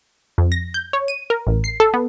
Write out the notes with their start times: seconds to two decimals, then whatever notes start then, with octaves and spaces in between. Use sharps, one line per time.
0.38 F2
0.52 A#6
0.74 G6
0.93 C#5
1.08 D#7
1.30 A#4
1.47 A1
1.64 C7
1.80 A4
1.94 B3